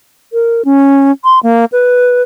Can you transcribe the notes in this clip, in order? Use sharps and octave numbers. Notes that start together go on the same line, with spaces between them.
A#4
C#4
C6
A#3
B4